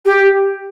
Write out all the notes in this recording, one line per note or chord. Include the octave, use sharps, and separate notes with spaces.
G4